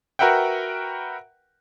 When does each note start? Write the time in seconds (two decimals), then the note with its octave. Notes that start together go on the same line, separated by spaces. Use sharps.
0.19 F#4 A#4 B4 E5 F#5 G5